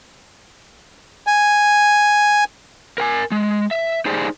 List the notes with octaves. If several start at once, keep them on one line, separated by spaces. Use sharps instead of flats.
G#5
A#4 G5 G#5
G#3
E5
D#4 G4 G#4 C5 D5